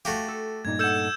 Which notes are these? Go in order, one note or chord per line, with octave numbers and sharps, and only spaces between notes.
A3 F#4 G4 F5
A4
G2 A#2 D#4 G#6
A4 F#5 E6 G6 E7